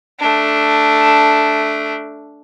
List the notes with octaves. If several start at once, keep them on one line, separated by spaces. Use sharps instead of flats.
A3 D4